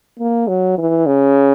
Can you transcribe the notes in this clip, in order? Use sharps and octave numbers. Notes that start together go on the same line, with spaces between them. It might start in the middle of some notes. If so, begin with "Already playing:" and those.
A#3
F#3
E3
C#3